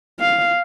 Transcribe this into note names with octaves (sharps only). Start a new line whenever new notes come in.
F5